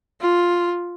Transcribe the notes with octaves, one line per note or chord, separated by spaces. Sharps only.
F4